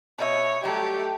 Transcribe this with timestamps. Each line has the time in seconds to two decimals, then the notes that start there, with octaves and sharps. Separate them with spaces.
0.19 B2 C#5 D#5 E5
0.64 F#3 G3 A3 G4